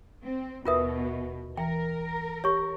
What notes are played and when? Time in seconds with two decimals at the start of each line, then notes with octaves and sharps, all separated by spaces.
0.23 C4
0.66 D#2 B2 F4 A#4 B4 E5 D#6
1.57 E3 A#4 G5
2.44 G4 C#5 C#6